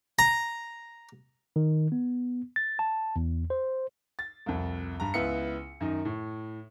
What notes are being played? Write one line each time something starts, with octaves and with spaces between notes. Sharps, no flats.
A#5
D#3
B3
A6
A5
E2
C5
A6
C2 F2
G2 A#5
C#2 B3 E4 C#7
F#2 D#3 D#4
A2